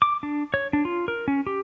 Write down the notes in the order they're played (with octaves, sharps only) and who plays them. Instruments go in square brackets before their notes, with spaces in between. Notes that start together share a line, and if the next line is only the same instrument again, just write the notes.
[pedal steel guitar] D6
D4
C#5
D4
F4
A#4
C#4
G4